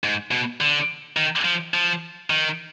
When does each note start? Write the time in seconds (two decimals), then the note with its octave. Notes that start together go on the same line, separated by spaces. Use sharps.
0.04 G#2
0.31 B2
0.61 D3
1.17 D#3
1.45 F3
1.74 F3
2.30 D#3